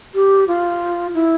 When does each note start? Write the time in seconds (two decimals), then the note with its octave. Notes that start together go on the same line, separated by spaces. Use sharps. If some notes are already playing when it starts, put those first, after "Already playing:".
0.15 G4
0.48 F4
1.14 E4